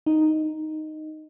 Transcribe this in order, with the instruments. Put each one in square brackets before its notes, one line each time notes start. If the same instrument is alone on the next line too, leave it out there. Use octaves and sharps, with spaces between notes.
[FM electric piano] D#4